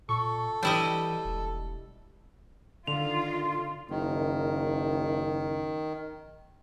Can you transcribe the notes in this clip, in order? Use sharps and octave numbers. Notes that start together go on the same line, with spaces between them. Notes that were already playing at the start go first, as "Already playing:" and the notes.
A#2 A4 C#6
E3 G3 E4 D#5 G5
E1
D3 D#3 F4 C6 F7
F#1 D#3